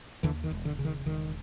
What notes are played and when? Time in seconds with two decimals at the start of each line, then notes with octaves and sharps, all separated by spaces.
0.23 D#2 D3 E3
0.44 D#3
0.51 E1
0.65 D3
0.79 C#3
0.85 D#3
1.06 E1 D#3